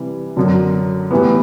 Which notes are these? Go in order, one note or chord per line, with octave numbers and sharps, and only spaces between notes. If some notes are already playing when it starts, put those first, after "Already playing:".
Already playing: C3 E3 G3
F#2 D3 F#3
A2 E3 G3 B3